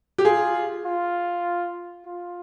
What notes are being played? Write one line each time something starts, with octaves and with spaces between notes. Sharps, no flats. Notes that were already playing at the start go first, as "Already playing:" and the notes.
G4
F4 G#4
F4
F4